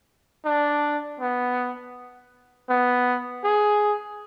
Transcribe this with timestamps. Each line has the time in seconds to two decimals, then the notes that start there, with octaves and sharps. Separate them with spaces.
0.45 D4
1.20 B3
2.69 B3
3.44 G#4